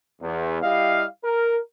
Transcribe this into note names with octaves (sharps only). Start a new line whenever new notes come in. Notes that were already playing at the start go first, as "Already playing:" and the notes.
E2
G3 E4 G4 D#5 F5
A#4